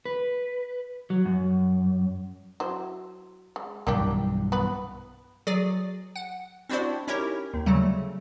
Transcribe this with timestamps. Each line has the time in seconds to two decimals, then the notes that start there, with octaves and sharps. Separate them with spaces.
0.06 B4
1.10 F#3
1.25 F#2
2.60 F#3 E4 C5
3.56 G#3
3.87 B1 G2 E3 A#3 D4 G4
4.52 B3 B4
5.47 F#3 G#4 D5
6.16 F#5
6.69 C4 D4 E4 F#4 C5 D5
7.08 C#4 D#4 E4 G4 A#4 C#5
7.54 D#2
7.66 C#3 F#3 G3 A3